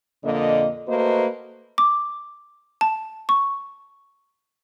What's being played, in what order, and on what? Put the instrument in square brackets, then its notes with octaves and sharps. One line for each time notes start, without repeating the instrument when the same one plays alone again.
[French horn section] F2 A#2 D3 A#3 D#5
A3 A#3 F#4 B4 C5 D#5
[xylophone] D6
A5
C#6